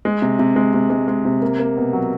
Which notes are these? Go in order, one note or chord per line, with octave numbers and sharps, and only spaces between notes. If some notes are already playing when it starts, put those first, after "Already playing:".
G#3
C3
C3
G#3
C3
G#3
G#3
C3
A#3
A#3
B2
F#3